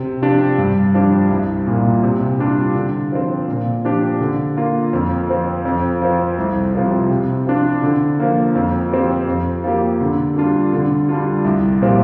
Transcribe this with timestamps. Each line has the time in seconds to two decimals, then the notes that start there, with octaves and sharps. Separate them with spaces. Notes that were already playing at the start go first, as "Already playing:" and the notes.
Already playing: C3
0.22 F3 D4 G4
0.58 G2
0.94 F3 D4 G4
1.31 C2
1.67 A#2 A#3 F4
2.03 C3
2.39 G3 D4 F4
2.75 D3
3.12 F3 C4
3.48 A#2
3.85 F3 D4 G4
4.20 D3
4.57 A#3 F4
4.93 F2
5.29 F3 C4
5.65 F2
6.02 F3 C4
6.38 C2
6.75 C3 F3 C4 F4
7.10 C3
7.47 F3 D4 F4
7.83 D3
8.19 F3 A#3
8.55 F2
8.92 F3 C4 G4
9.28 F2
9.64 F3 A#3 G4
10.01 D3
10.36 G3 D4 F4
10.73 D3
11.09 G3 D4 F4
11.45 C2
11.82 A#2 F3 C4 G4